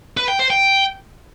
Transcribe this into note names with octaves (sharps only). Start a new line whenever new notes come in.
B4
G5
C5
G5